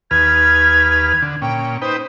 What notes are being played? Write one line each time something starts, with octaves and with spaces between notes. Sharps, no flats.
D#2 B4 F6 G#6
D3
A#2 C#4 G5
D#4 B4 C5 G5